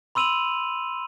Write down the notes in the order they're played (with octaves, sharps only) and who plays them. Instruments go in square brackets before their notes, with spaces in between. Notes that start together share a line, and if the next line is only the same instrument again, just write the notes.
[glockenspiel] B5 C6 E6 D#7 F7 F#7